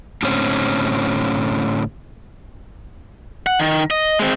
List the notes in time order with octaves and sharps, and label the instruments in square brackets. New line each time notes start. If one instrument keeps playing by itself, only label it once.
[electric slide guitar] A2 D3 C4 C#4
[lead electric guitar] F#5
D#3
D#5
G#3 C4